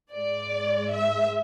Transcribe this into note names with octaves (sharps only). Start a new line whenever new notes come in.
G#2 G#3 D5
E5